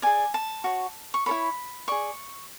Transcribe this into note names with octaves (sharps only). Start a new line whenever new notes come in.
G#4 D5 G#5
A5
F#4 C#5
C#6
E4 A4 C#5 B5
G#4 D5 C#6